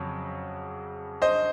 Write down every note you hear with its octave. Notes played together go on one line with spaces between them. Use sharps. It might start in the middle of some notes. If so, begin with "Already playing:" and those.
Already playing: F2 C#3 F#3
C5 D#5